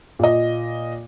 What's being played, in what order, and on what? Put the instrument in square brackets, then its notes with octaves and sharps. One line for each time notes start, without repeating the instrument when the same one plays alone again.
[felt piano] A#2 D#5